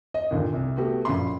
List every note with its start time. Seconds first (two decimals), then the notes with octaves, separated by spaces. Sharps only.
0.14 D#5
0.31 D#2 A#2 D3
0.53 C2 C3
0.76 A3 B3 F#4 G4
1.05 A#1 F#2 C#3 B5 C6